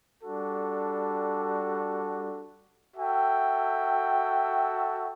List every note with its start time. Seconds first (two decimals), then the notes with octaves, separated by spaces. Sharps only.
0.23 G3 D4 F#4 A4
2.95 F#4 A4 E5 G5